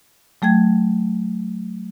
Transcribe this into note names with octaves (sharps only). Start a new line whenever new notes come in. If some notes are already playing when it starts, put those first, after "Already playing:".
F#3 A3 G5 G#6